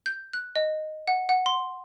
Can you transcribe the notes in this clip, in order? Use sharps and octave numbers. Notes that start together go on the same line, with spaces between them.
G6
F#6
D#5
F#5
F#5
C6